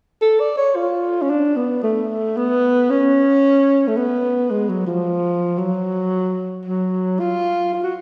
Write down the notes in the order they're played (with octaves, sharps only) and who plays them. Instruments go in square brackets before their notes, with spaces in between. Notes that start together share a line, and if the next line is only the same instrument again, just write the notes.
[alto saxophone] A4
D5
C#5
F4
C#4
D4
B3
A3
B3
C#4
A3
B3
G#3
F#3
F3
F#3
F#3
F4
F4
F#4